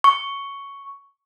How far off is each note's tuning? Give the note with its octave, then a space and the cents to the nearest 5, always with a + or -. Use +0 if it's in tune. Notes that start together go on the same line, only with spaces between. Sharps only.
C#6 +5